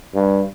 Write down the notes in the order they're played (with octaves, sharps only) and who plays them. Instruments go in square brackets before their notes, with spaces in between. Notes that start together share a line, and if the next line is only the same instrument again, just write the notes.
[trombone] G2